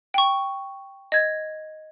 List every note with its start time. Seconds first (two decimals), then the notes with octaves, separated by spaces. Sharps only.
0.14 G5 C#6
1.12 D#5 G#6